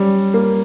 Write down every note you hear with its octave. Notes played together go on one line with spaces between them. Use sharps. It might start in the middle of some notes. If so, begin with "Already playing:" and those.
Already playing: G3 C#4
A#3